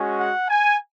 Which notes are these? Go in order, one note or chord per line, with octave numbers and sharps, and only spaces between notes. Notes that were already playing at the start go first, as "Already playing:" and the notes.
Already playing: G#3 C#4 F#4
F#5
G#5